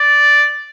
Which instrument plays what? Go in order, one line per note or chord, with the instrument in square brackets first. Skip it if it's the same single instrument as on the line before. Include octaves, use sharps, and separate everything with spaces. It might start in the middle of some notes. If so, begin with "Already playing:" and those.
Already playing: [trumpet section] D5